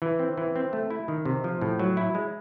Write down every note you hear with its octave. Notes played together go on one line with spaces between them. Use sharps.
E3
C4
E3
C4
A3
E4
D#3
C3
F3
A2
F#3
E4
G#3